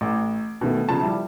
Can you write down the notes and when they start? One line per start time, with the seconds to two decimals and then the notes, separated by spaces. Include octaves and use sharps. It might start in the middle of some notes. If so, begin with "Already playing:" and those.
0.01 A1
0.61 B2 D#3 A3
0.89 C#3 F3 A5
1.01 F3 G3 E4